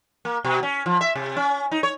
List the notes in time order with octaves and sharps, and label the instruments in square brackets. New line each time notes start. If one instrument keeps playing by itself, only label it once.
[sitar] A#3
B2
C#4
F3
E5
C3
C#4
D#4
C#5